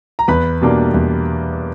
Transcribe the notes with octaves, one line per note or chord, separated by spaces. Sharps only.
A#5
E2 B4 B5
B2 G3 A#3 D4
E2